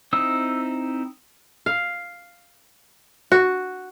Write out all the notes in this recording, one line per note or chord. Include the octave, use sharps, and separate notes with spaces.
C4 D#4 E4 E6
F5
F#4